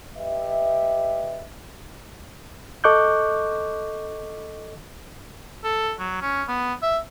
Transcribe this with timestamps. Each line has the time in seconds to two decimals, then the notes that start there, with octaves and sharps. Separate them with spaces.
0.17 G4 B4 D#5 E5
2.84 A4 D#5 C#6 D6 F#6 G6
5.64 A4
5.99 F#3
6.21 C#4
6.48 B3
6.82 E5